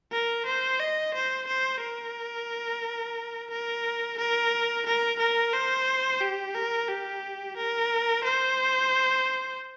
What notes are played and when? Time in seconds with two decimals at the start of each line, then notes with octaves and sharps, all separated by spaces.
0.12 A#4
0.46 C5
0.79 D#5
1.14 C5
1.47 C5
1.81 A#4
3.50 A#4
4.18 A#4
4.86 A#4
5.19 A#4
5.53 C5
6.21 G4
6.55 A#4
6.88 G4
7.56 A#4
8.24 C5